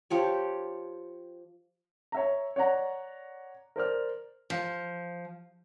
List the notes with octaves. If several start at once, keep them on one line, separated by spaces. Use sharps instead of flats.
F3 G4 C#5
C#5 E5 A#5
C#5 D5 F#5 A#5
A#4 C5 D5 F6
F3